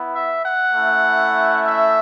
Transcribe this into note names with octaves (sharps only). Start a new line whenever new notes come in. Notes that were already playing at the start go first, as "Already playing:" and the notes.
Already playing: B3 E4
E5
F#5
A3 C#4 E4
E5